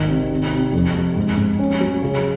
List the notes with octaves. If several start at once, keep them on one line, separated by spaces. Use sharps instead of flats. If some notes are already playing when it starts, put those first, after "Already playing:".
Already playing: G#1 D#3
C3
C3
C3
F2
F2
G#2
G#2
C#4
F#3
C#3